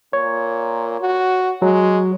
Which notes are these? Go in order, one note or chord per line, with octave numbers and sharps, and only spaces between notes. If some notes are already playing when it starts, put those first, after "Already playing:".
A#2 C#5
F#4
F#3 G#3